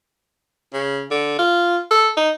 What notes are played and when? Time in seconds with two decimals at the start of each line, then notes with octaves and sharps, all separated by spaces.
0.73 C#3
1.11 D3
1.39 F4
1.91 A4
2.17 D#4